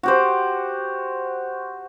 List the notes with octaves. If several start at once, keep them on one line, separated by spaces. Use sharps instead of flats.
F#4 G4 C5